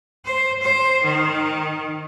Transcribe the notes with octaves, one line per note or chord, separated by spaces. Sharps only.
C5
C5
D#3